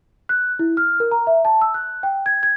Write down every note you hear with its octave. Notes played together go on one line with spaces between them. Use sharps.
F#6
E4
F6
A#4
A#5
E5
A5
E6
F#6
G5
G#6
G#6